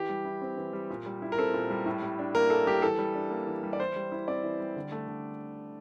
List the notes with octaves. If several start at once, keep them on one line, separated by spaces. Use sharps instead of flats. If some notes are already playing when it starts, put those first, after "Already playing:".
Already playing: E3 G4
G3
E4
C4
E3
G3
A#2
G3
E4
A#4
C4 A4
A#2
G3
A2
G3
D4
A#3 A#4
A2 A4
G3 G4
E3 A4
G3
D4
A#3
E3
G3
D5
E3 C5
G3
E4
C4 D5
E3
G3
D3
A3
D3